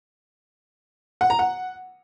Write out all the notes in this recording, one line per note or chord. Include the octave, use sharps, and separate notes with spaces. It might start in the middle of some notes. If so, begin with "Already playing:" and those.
F#5
A#5
F#5